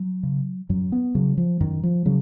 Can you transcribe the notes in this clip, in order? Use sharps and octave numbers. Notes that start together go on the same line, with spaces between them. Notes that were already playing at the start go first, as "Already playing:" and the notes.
Already playing: F#3
C#3
F#2 F#3
B3
C#3 F#3
F3
F#2 D#3
F3
C#3 F#3